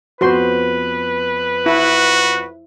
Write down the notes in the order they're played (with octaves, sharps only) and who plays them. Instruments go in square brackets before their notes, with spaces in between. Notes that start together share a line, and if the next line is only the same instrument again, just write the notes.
[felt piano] F2 B3 [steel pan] F#4 C5 C6 [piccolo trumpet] B4
[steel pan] E4 [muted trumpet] F#4